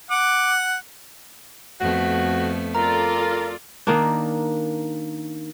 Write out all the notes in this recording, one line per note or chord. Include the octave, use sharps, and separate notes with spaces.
F#5 D6
F2 A3 B3 F#4
F4 A4 A#4 D5 A#5
D#3 A#3 D4